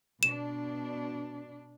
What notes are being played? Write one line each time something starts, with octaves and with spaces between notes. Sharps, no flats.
B2 D4 E7